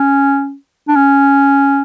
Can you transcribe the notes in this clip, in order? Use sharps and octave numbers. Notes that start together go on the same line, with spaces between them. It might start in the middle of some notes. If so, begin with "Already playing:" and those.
Already playing: C#4
D4
C#4